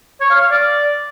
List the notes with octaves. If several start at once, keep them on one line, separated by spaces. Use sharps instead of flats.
C#5
F5
F5
D5